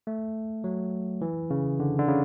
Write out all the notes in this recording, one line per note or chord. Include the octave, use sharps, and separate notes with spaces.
A3
F#3
E3
C#3
D3
D3
C#3